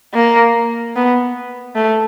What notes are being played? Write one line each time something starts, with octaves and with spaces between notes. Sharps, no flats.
A#3
B3
A3